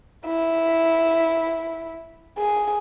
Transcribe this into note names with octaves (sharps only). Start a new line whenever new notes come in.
E4
G#4